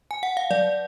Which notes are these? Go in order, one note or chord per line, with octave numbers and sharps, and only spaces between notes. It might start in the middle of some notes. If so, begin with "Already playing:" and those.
G#5
F#5
F5
F#3 D5